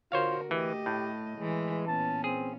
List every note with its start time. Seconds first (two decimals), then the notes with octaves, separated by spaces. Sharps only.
0.12 D3 F4 F#4 A#4 C5 C#5 F5
0.51 E3 A3 G4 D#5
0.86 A2
1.38 E3 G#3
1.87 A#2 B3 C#4 A5
2.24 C4 G#4